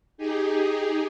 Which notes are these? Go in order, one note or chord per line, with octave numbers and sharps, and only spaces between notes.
D#4 G4 G#4